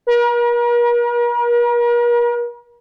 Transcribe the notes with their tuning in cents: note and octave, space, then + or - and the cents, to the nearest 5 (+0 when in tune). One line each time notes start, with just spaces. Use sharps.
A#4 +45